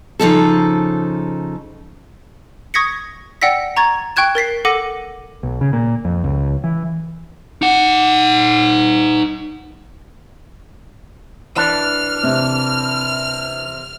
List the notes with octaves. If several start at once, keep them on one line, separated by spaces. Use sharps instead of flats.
C#3 F3 D#4 A4
C#6 D#6 G#6 A#6 B6 C#7
D5 F#5 G5 E6 A#6 B6
A#5 C#6 G#6 A6
G5 C#6 F#6 G#6 E7
A#4 A6 B6 C7
A4 F#5 D6 A#6 D#7
B1
C#3
A#2
F2
C#2
E3
D#4 F#5
E3 D4 F6
C3